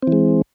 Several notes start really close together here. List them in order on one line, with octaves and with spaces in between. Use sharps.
C4 E3 G#3